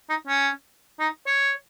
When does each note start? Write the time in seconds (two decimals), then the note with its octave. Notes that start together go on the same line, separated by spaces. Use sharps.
0.09 D#4
0.27 C#4
0.99 D#4
1.27 C#5